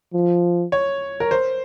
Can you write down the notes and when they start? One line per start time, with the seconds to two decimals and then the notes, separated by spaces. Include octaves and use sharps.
0.14 F3
0.72 C#5
1.20 A#4
1.31 C5